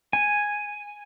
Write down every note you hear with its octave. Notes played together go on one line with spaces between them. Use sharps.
G#5